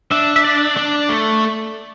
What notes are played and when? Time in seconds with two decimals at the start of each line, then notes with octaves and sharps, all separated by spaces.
0.11 D4 E5
0.36 E5
0.44 D5
0.77 D4
1.09 A3